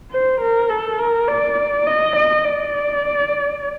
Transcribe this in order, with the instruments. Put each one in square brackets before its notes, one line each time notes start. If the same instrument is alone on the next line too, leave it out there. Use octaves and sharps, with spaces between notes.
[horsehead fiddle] C5
A#4
A4
A#4
D5
D#5
D#5
D5